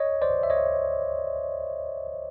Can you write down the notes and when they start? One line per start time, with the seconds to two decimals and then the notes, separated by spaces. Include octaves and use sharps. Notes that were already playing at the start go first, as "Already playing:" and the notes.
Already playing: C#5 D#5
0.22 C5 D5
0.43 E5
0.50 C#5 D#5